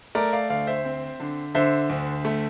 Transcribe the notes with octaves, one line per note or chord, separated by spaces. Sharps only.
A3 A#4 D5
D5 F5
D2 D5 F5
C5 E5
C4
D3
D3 C5 E5
D2
A3